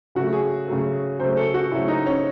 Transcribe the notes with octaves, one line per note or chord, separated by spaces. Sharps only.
C#3 F#3 A3 F#4
G#4
C#3 F#3 A3
C#3 F#3 A3 C5
A4
F#4
C#3 F#3 A3 E4
D#4
C#4